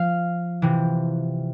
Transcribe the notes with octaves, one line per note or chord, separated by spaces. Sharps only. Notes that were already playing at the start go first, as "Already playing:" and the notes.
Already playing: F3 F5 F6
C3 E3